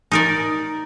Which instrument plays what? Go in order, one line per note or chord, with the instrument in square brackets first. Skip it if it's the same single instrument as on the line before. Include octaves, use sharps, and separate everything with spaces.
[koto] D#4 A#4 D5